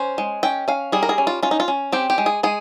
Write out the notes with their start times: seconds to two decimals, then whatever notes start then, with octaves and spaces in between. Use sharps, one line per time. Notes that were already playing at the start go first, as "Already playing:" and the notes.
Already playing: C#4 C5
0.18 G#3
0.43 C#4 G5
0.68 C#4 F5
0.92 G3 G#4
1.03 A#4
1.09 G#4
1.18 C#4
1.27 F4
1.43 C#4 F4
1.51 D#4
1.60 F4
1.68 C#4
1.93 C4 G4
2.10 G4
2.18 G#3
2.26 G#4
2.43 G#3 G#4